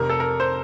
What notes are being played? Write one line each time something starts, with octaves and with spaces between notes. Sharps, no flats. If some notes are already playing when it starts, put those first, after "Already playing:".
Already playing: F1 F2 C3 A#4
A4
A#4
C5